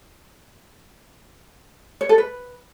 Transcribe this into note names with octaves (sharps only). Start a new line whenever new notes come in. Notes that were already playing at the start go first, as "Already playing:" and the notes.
C#5
A4
B4